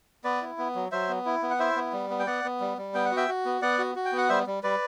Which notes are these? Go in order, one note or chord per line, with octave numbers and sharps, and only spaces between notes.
B3 B4 D5
E4
B3
F#3
F#3 C5 E5
B3
E4
B3
F#5
E4 C5 E5
B3
G3
B3
G5
B3 D5 F#5
B3
G3
G3
B3 G5
F#5
F#4
E5 G5
F#4
B3
B3 D5 F#5
F#4
F#4
G5
B3 F#5
G3 C5 E5
G3
G3 B4 D5